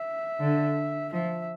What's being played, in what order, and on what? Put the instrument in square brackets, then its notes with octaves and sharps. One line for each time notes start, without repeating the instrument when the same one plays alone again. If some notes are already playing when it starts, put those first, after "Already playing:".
Already playing: [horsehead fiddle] E5
[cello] D3
[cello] F3 [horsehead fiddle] E5